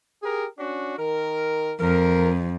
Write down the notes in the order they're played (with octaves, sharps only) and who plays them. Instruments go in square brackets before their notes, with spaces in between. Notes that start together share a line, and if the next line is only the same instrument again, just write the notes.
[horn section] G4 G#4 A#4
C#4 D4 F#4
D#3 A#4
[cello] F2 [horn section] A#4